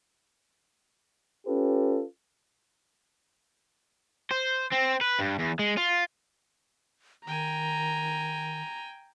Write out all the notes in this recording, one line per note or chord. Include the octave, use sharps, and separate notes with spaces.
C#4 F4 G4 A4 B4
C5
C4
B4
G2
E2
G#3
F4
D#3 G5 G#5 A#5